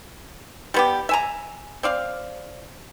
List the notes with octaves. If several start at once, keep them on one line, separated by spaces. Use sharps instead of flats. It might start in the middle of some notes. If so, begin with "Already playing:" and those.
G3 B3 G4
E5 G#5 A#5
C4 D5 F5